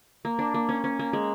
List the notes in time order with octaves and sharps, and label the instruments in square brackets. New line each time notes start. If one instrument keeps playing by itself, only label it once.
[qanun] A#3
D4
A#3
C#4
C#4
A#3
G#3